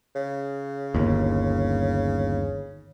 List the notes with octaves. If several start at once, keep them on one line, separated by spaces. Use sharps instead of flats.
C#3
G1 D#2